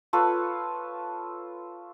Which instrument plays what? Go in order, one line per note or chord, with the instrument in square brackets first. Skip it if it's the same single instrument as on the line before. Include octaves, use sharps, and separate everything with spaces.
[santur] F4 A4 B4 C#5